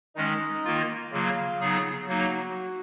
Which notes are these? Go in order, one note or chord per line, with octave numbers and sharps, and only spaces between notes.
D#3 G#3 C#4 D#4
D#3 A#3 F4
C#3 F#3 A#3 F4
C#3 F#3 B3 D#4 G#4
F#3 A#3 D#4 F#4